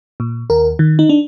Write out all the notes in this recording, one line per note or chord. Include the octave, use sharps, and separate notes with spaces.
A#2
D#2 A#4
D#3
D#4
D4